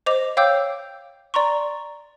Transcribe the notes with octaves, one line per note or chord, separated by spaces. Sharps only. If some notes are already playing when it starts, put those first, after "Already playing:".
C5 D#5 D6 F7
C#5 F5 G5 D6 E6 G6
D5 A#5 C6 C#6